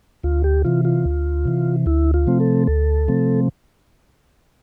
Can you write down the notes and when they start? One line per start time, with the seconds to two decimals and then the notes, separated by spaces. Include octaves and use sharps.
0.23 D2 F4
0.44 G4
0.65 C3 E3 F4
0.85 F4
1.05 D2
1.45 C3 E3
1.86 D2 E4
2.14 F4
2.27 C3 F3 A3 C4
2.40 A4
2.67 D2 A4
3.08 C3 F3 A3 C4